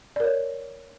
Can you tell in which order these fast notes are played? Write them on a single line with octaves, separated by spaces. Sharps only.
D5 A#4 C#5